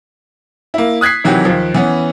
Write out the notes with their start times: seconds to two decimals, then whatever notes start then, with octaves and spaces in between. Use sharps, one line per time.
0.74 A#3 E4
1.01 D#6 F#6 G#6 B6 C7
1.24 C3 D#3 E3 F#3 F#4 G4
1.45 D#2 F3
1.74 E3 B3 C#4